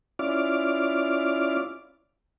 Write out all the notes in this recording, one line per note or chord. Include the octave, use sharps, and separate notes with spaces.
C#4 E4 F4 D5 D6 F6